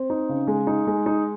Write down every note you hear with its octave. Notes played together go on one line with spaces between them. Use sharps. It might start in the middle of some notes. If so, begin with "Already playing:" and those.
Already playing: C4
D#4
C#3
G#3
D#4
G#3
D#4